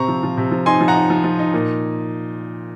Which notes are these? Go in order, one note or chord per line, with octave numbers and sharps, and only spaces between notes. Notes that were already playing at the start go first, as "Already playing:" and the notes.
Already playing: C3 C4 A#5 C#6
F3
F3
C3
F3
D#4 G#5 C6
F3
F#5 A#5
D#4
F3
F3
D#4
A#2